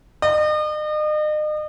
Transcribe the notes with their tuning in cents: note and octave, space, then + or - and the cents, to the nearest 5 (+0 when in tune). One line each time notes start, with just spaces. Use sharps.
D#5 -40